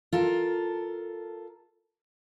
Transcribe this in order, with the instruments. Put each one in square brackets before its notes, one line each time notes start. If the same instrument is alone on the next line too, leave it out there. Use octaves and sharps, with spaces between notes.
[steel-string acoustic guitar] F4 A4 A#4